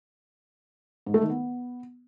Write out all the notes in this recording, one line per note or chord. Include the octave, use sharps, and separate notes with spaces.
G#2
A3
D#3
B3